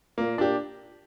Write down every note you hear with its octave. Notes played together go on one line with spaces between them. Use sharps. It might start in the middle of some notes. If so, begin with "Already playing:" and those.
A#2 A#3
D4 G4